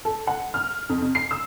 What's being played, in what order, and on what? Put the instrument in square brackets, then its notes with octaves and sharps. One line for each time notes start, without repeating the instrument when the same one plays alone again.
[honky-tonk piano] A4
F#5
F6
F2
C3
C7
E6